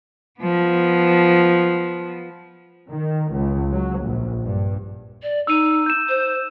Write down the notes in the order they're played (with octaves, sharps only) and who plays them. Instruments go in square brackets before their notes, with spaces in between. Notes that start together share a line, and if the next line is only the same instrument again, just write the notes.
[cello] F3 B3
[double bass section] D#3
C#2
F#3
A#1
G2
[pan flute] D5
[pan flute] D#4 [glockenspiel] E6 D#7
[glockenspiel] G6 E7
[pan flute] C5